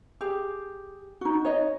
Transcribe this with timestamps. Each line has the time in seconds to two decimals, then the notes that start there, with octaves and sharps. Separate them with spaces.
0.21 G4 G#4
1.21 D#4 F#4
1.45 C#5 D#5